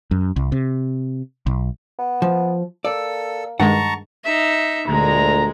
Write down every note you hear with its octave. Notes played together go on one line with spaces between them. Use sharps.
F#2
C2
C3
B1
B3
F3
A#3 A4 D5 E6
G2 D#3 G#3 F#5 A5 A#5 C#6
D#4 E5
D2 A#2 G#3 A#5